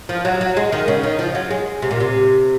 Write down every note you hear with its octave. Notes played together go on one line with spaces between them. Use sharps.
F3
F#3
F#3
G#3
D#3
C#3
D#3
F3
F#3
G#3
C3
A#2
C3